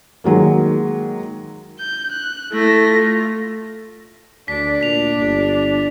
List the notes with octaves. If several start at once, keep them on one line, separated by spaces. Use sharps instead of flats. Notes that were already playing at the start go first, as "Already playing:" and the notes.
D#3 F#3 G#3 A#3
G6
F#6
A3 E4 A#6
F4
D2 D4 B6
A#2 B6 F7
G1